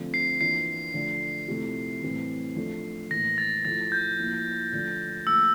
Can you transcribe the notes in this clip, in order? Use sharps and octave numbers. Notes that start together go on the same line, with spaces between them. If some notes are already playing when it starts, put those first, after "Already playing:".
Already playing: D3 F3 A3 C4 F4
C7
E3 A#3 D4 F4 C7
D3 F3 A3
C3 F3 A3 E4
A2 E3 G3 C4 E4
F3 A3 D4
A2 E3 A#3 A#6
A6
F3 A3 E4 A6
G6
A#2 F3 A#3 E4
D3 F3 A3 D4 F4
A#2 F3 A3 E6